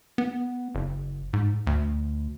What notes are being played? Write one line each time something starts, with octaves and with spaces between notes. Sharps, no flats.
B3
F#1
G#2
D2